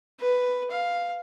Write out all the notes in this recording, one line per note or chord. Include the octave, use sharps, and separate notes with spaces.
B4
F5